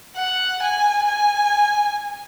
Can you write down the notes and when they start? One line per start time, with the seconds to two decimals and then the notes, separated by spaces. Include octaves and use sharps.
0.16 F#5
0.62 G#5
1.08 G#5